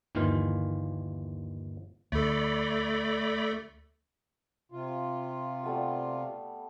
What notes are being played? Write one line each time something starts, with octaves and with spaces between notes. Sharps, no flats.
G1 D#2 D#3 E3 F4 F5
D2 A3 A4 D5 B5
C3 F4
G3 A3 B3